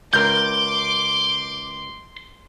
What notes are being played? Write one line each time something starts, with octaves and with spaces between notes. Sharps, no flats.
C#2 A#4 C6 D6 G6